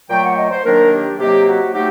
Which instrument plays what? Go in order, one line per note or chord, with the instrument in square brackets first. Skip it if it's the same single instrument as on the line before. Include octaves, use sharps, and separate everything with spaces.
[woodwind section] A#2 F#3 A3 G5
F#5
D#5
C5
D#3 F#3 A#3 D4 A#4
G4
C3 F#3 A#3 D#4 G4
F#4
F#3 A3 D#4 G4